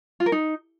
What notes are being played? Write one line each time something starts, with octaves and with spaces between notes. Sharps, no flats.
F4
A#4
D#4